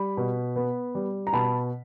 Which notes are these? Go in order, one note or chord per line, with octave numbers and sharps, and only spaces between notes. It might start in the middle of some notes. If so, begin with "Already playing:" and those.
Already playing: G3 B5
B2
B3
G3
A#5
B2 A5 B5